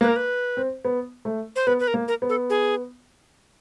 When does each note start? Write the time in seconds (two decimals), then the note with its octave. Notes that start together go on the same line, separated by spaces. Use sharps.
0.01 A#3 B4
0.08 A#4
0.16 B4
0.57 C4
0.85 B3
1.25 A3
1.56 C5
1.67 B3 B4
1.79 B4
1.87 A#4
1.94 A#3
2.08 A#4
2.22 B3
2.29 A4
2.50 G#4